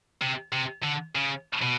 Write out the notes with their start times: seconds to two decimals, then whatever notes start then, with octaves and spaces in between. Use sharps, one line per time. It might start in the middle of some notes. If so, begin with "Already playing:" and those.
0.21 C3
0.53 C3
0.84 D3
1.15 C#3
1.62 B2